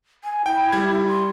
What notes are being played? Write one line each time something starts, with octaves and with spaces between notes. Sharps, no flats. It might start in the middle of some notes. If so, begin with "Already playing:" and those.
G#5
E4 G5
G3 G#6
C6